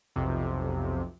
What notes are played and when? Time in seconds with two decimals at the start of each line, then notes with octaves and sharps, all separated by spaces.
0.16 B1 F2 C3